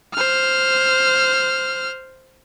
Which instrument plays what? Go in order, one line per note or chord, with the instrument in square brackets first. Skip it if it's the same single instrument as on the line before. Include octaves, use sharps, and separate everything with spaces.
[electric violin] C5 F6